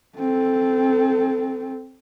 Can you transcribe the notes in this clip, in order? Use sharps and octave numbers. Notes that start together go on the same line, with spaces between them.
C4 A4